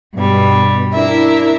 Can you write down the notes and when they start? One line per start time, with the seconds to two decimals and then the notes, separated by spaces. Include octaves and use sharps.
0.14 G2 B2 G3
0.94 D4 E4 A#4 E5